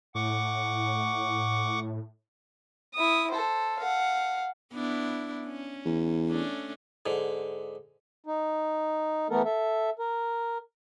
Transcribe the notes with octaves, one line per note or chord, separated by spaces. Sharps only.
A2 F#5 C#6 D6
E4 D#6
A4 C5
F5 F#5
B3 D4 E4
C#4
E2
A3 C#4 D4
G#2 D3
D#4
E3 A3 B3 A4 A#4
A4 E5
A#4